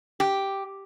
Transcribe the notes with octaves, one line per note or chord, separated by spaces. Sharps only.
G4